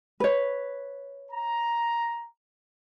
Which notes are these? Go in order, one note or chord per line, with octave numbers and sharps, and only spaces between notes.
B4 C#5
A#5